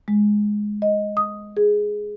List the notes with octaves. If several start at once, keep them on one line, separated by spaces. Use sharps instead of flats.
G#3
D#5
D#6
G#4